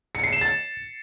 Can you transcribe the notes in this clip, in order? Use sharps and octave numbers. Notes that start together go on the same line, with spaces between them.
C#7
C7
E7
A6